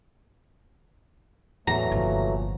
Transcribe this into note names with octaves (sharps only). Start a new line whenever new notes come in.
E2 A2 E3 F#3 A3 A#5
G1 A#2 F3